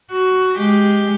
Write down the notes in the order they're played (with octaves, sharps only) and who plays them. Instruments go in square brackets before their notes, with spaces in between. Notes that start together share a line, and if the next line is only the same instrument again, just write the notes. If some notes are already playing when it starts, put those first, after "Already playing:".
[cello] F#4
G#3 G4